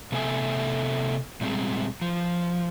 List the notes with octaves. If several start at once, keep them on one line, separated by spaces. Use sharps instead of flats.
C3 A3 B3 A4 E5 G#5
A#2 G3 G#3 C4 G#4
F3